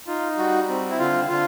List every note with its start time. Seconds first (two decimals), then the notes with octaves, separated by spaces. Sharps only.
0.07 D#4 F4
0.37 G3 F#4
0.69 C4
0.90 E4
0.99 D3 F4
1.29 D3 F4